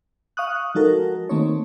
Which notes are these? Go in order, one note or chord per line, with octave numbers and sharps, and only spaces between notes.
F5 C#6 D#6 F#6
F3 G#3 D#4 F#4 A4 A#4
D#3 A3 A#3 C4 D#4 C#5